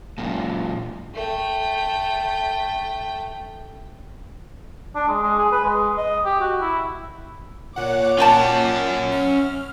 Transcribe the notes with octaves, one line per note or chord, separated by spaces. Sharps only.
F#2 A#2
A3 G5
D4
G#3
G#3
G#4
B4
G#3
D#5
G4
F#4
E4
A#2 C#5 F#5 D6
A#2 C#4 D5 F#5 G5 A5 A6
E5
F6